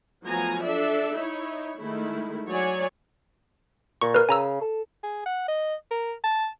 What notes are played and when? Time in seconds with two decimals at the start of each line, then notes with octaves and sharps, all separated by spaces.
0.25 F3 F#3 A3 B3 G#5 A#5
0.63 D4 A4 D5 E5
1.17 D#4 E4 C#5
1.77 D#3 G#3 A3 E4
2.47 F#3 C#5 D5 G#5
4.02 A#2 C#6
4.14 A#4 B4
4.29 C#3 G#5 A#5 E6
4.61 A4
5.03 G#4
5.26 F#5
5.48 D#5
5.91 A#4
6.24 A5